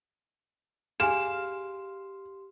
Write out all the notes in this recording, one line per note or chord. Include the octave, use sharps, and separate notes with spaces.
G4 G#4 F5 G#5 C6 E7